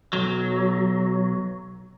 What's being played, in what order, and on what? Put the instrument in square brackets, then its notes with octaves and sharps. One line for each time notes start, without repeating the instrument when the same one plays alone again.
[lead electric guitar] B1 F#3